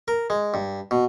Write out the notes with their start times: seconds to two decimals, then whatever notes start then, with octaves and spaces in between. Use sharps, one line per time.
0.08 A#4
0.30 G#3
0.54 G2
0.91 B2